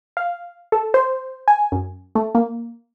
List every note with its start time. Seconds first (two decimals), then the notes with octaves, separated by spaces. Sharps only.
0.17 F5
0.72 A4
0.94 C5
1.48 G#5
1.72 F#2
2.15 A3
2.35 A#3